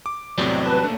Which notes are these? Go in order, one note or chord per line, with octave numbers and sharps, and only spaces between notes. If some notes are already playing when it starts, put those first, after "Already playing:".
D6
E2 A2 C3 F#3 G3 C4 D5
B2
B4 A5
A3 A#3 D4